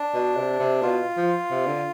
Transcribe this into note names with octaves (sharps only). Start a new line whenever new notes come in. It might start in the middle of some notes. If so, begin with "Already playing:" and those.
Already playing: D4
B2
C3
C3
B2 F4
F3
C3
D3